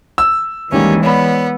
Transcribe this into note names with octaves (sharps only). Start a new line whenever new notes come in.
E6
D#2 E3 G3 G#3 A#3 C#4
B3 C#5 D5 B5